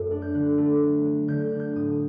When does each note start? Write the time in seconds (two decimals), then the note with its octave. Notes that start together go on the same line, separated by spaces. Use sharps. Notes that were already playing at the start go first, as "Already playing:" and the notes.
Already playing: F#2 A3
0.11 D4
0.22 G6
0.34 D3 F#6
0.58 A3
0.82 F#3
1.05 F#3
1.28 D3 G6
1.44 G6
1.52 D4
1.60 G6
1.76 A2 D#6